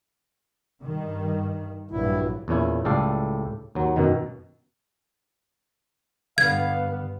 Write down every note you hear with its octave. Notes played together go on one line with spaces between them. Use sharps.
G2 D#3
A#1 G2 F#3 E4
E2 A#2 C#4 E4
C#2 A2 G3 A4 D5 F5
D#2 F#3
F#2 B2 D#3
G2 D3 B3 F5 G#6